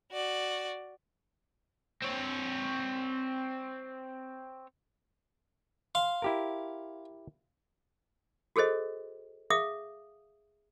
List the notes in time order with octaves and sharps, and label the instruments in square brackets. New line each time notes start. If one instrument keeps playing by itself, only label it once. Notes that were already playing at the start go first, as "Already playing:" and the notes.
[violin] F#4 D5
[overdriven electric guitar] C4 C#5
[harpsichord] F5 C6
[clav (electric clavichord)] E4 G4 A#4
[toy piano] F#4 G#4 A4 C5 D#5
G#4 E5 F5 D#6